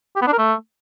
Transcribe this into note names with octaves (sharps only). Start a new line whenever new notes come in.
G4
B3
D4
A#4
A3